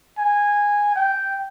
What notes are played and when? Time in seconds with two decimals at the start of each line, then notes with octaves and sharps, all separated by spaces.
0.18 G#5
0.96 G5